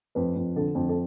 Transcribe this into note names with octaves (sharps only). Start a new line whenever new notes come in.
F2 B4
F2
D3 A4
F2
A4